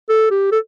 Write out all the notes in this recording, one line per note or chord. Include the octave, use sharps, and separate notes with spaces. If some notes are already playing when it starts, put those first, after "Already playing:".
A4
G4
A4